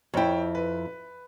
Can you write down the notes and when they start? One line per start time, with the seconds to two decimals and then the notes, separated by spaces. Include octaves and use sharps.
0.14 F2 E4 C#5 G5
0.55 B4